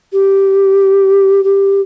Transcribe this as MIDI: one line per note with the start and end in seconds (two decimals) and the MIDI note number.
0.12 1.43 67
1.44 1.81 67